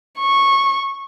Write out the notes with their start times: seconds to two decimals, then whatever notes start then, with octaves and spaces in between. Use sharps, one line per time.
0.19 C#6